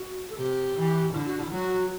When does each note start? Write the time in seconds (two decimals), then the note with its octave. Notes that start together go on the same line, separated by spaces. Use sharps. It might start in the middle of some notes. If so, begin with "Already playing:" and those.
Already playing: F#4
0.29 A4
0.36 C3 G4
0.75 E3
1.13 D3 E4
1.26 F#4
1.39 E4
1.51 F#3 F#4